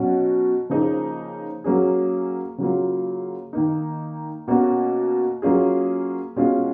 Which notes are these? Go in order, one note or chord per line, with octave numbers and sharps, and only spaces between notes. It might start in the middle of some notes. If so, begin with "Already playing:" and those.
Already playing: B2 F#3 C#4 F#4
C#3 F3 A#3 D#4 G#4
F#3 A#3 C#4 G#4
C#3 F#3 A#3 F4
D#3 A#3 D#4
B2 A#3 C#4 F#4
F#3 A#3 C#4 F4 G#4
B2 G#3 C#4 F4 G#4